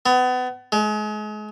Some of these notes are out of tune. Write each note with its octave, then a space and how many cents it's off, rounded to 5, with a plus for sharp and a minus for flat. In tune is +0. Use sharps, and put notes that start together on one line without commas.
B3 +30
G#3 +35